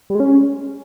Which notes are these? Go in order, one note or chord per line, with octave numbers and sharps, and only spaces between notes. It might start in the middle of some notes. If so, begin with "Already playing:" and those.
G3
G#3
C#4